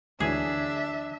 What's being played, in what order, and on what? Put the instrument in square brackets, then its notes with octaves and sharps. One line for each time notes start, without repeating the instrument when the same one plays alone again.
[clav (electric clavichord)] D2 E3 F#3 [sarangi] D4 [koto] G#4 [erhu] E5